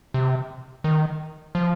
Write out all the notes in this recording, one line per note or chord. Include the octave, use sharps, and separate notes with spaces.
C3
D#3
F3